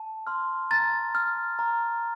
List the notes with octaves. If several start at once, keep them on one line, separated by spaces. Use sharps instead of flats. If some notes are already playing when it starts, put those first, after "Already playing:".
Already playing: A5
C6 F6
A#5 A6
F6
A#5